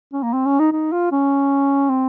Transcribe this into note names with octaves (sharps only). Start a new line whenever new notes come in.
C#4
A#3
C4
C#4
D#4
D#4
F4
C#4
C4